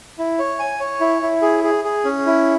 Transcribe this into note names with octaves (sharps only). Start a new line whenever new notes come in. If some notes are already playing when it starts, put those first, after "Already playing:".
E4
C#5
G#5
C#5
E4
E4
G#4
G#4
G#4
C#4
E4